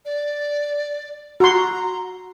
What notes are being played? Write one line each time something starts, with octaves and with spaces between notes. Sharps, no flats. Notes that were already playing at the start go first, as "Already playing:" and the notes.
D5
F#4 A#5 C6